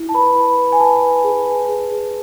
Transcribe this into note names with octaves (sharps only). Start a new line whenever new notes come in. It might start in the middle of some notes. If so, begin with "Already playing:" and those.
Already playing: E4
A5
B4 B5
B4
B4
G#5
B4 A5
B4
G#4
B4
G#4
G#4